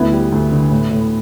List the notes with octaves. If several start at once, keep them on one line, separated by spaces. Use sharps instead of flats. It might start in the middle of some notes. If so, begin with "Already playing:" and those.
Already playing: D2 B3 E4
G3
D2
D3
A2
A2